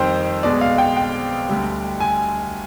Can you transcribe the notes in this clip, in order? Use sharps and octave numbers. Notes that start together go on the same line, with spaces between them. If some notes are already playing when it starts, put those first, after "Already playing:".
Already playing: F2 D#3 G3 C5 G5
B1 B2 G#3 D5
F5
G5
G5
D2 D3 G3
G#5